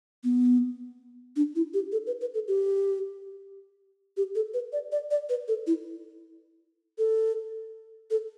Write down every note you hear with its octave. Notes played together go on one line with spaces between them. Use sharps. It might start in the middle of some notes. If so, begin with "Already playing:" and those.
B3
D4
E4
G4
A4
B4
B4
A4
G4
G4
A4
B4
D5
D5
D5
B4
A4
E4
A4
A4